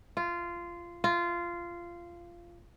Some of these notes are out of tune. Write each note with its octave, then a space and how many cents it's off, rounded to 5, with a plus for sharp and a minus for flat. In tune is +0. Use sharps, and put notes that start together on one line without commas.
F4 -15
F4 -15